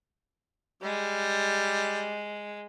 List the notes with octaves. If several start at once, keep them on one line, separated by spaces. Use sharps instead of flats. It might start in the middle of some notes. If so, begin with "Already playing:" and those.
G3 G#3